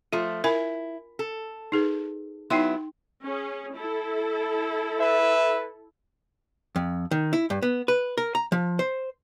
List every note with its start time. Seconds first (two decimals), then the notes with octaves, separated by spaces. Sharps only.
0.13 F3 A3 F4
0.44 E4 A#4 G#5 B5
1.19 A4
1.72 D#4 G#4 B4
2.50 F#3 B3 D#4 E4 G5 C6
3.23 C#4 G#4
3.74 E4 A4
4.99 B4 E5
6.76 F2
7.11 D#3
7.33 E4
7.50 G2
7.62 B3
7.88 B4
8.18 A#4
8.35 A#5
8.52 F3
8.79 C5